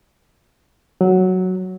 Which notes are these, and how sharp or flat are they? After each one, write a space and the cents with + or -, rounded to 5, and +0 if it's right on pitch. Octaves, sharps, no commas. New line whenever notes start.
F#3 +0